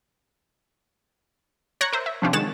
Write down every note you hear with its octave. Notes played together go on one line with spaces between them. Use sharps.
C#5 A#5 F#6 G#6 A#6 C#7
A#4 C5 E5
E5
C3 F3 C#4 D4 F4 G4
D#3 G#3 C#5 F#5 A6 E7